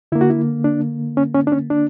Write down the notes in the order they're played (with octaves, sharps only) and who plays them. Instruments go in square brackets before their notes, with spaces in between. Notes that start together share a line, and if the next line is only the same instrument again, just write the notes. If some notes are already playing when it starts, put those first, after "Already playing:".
[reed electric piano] D3 A#3 E4
F#4
E4
D4
C#4
C#4
D4
C#4
D4